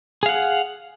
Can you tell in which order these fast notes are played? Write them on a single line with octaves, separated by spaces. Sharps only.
G#4 F5 F#5